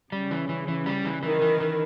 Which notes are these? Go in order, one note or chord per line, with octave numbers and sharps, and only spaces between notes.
C#3 G3
E3
E3
E3
G3
E3
D#3 E3
E3
E3